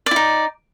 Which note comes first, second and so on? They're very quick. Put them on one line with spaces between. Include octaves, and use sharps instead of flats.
D5 E4 D#4